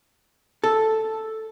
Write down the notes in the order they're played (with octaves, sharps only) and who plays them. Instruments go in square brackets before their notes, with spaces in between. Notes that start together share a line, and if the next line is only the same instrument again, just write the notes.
[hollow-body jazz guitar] A4